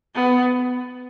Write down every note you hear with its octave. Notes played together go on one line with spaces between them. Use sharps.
B3